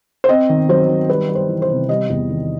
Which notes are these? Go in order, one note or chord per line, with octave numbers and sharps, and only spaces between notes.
C5
C4 D#5
D#3
F#3 C5
D#3
G3 B4
G3
C5
E3
C5
C3
G3 D#5
E2
D#3